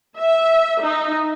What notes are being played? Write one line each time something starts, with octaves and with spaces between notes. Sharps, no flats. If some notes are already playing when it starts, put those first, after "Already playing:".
E5
D#4